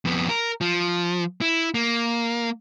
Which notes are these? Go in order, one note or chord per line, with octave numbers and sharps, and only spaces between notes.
F2 B3
A#4
F3
E4
A#3